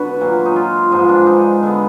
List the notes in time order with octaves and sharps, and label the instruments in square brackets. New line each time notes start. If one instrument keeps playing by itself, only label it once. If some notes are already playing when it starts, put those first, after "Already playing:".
Already playing: [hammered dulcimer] D3 B3 F#4 B4
A#2 F#3 A#3
D#4
F4
G#2 F3 G#3 B3 D#4
D4
D#4
D3 G#3 B3